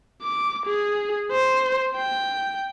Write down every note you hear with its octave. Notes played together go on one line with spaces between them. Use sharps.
D6
G#4
C5
G5